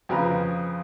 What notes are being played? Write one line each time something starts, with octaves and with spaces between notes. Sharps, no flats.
F2 C#3 F3 B4 A#5